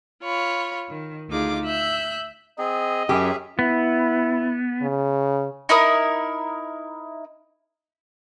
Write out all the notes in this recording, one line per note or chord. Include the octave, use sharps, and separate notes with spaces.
F4 C#5 B5
D#3
D2 D#4 F4 G#4 D6
E5 E6 F#6 G6
C4 G#4 D#5
F#2 C#4 G4 G#4 E5
B3 E4
C#3
D#4 E4 A#4 D#6